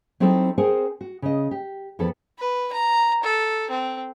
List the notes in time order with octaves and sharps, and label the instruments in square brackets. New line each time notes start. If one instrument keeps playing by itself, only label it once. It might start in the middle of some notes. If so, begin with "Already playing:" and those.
[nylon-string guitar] F#3 C4 D#4 E4 A4
C4 G#4 A#4 C5 F#5 G#5
F#4
C#3 D#5
G4
F2 E3 B3 A4
[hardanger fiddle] B4
A#5
A4
C4